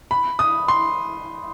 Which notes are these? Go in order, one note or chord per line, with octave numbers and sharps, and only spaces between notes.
B5
D#6
C6